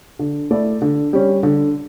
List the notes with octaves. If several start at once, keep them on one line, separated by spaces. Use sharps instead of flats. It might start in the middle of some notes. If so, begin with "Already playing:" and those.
D3
A3 E4 A4 D5
D3
G3 C#4
D3